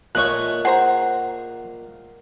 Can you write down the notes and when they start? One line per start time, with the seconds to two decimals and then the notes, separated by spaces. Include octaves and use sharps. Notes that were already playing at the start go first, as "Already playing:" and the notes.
0.15 A#2 G#3 A3 C#5 D#5 C#6 F#6
0.65 G#4 C5 F#5 A#5